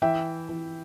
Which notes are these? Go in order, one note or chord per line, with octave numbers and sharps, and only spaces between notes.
E3 E5 G5
E3